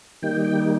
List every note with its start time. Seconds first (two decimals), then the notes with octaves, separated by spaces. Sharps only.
0.22 D#3 G3 A#3 D#4 G5
0.45 G5